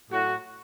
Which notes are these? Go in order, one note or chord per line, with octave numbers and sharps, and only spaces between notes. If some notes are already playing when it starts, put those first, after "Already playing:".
A2 F#3 F#4